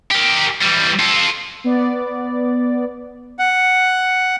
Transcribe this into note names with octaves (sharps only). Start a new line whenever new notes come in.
G4 A#4
E3 G3
F4 A4
B3 D5
F#5